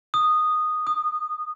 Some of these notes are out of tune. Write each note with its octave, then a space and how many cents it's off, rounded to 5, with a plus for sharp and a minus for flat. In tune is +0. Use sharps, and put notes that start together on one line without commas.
D#6 -10
D#6 -25